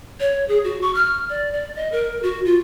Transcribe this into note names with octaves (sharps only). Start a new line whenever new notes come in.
C#5
G#4
F#4
C#6
F6
D5
D5
D#5
A#4
F#4
F4